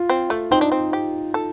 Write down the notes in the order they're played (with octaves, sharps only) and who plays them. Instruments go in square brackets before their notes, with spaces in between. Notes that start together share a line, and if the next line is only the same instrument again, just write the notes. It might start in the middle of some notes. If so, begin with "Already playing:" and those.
Already playing: [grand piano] F4
[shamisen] C4
A3
[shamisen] C4 [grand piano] D#4
[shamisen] D4
C4
G4
A4